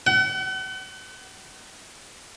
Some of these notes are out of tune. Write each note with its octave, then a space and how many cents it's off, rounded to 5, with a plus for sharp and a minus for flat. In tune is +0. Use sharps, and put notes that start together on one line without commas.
F#5 +40